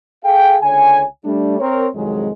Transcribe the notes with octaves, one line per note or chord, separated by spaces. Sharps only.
G#4 A4 F5 G5
C#2 D3 C#5 G#5
G3 A3 D4
C4 A#4 C#5
C2 F2 D#3 F#3 G#3